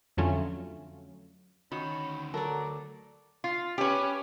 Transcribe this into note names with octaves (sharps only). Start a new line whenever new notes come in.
F2 D3 F#3 A3 C#4 F4
D2 D#3 C#4 F#4 B5
F#3 A4 A#4 D5
F4
C#4 G4 B4